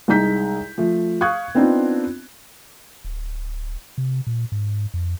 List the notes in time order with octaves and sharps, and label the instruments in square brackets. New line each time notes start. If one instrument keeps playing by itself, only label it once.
[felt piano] C2 G#3 D#4 A#5 G6 B6
F3 A3
F5 C#6 D#6 F#6 G#6
B3 C4 D4 D#4 F4
[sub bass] D1
C3
A#2
G#2
F2